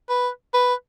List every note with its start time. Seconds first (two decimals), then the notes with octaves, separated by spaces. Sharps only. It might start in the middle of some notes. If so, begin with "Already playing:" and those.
0.09 B4
0.54 B4